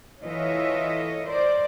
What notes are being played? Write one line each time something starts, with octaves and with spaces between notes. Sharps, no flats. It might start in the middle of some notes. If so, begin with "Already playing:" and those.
E3 F4 A4 C#5 D#5 E5
A#4 C5 D5